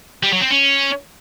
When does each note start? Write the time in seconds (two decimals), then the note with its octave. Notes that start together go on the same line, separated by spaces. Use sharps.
0.23 G3
0.32 F#3
0.41 C4
0.50 C#4